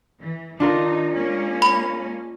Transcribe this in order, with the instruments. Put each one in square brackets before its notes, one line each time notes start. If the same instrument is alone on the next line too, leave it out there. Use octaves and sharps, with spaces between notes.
[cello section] E3
[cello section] D#3 D#4 [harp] D4 F4 A#4
[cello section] G#3 A#3 C#4
[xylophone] B5